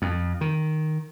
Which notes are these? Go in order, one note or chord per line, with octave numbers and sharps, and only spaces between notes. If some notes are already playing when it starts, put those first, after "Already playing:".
F2
D#3